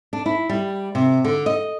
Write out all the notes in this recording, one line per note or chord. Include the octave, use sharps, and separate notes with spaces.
D4
E4
G3
C3
D3
D#5